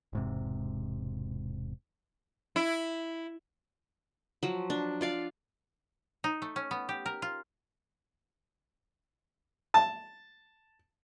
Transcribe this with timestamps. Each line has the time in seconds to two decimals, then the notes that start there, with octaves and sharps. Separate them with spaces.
0.13 E1 G#2 C3
2.56 E4
4.43 F3 F#3
4.70 D4
5.01 F4 D5 F5
6.24 D#4
6.42 A3
6.56 C#4
6.71 B3
6.89 G4
7.06 A#4
7.22 F4
9.74 A5